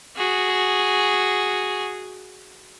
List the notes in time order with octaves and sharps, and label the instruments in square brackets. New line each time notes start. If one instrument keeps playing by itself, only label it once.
[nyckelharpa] F#4 G#4